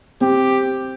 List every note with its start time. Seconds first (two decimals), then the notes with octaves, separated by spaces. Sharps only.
0.21 C4 G4